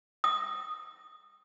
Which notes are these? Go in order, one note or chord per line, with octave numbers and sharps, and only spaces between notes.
D#6